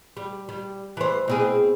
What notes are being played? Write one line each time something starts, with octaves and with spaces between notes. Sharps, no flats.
G3
G3
E3 C5
B2 C4 G#4